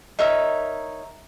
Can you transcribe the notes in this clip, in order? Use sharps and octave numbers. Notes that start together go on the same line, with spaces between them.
D#4 A#4 C#5 E5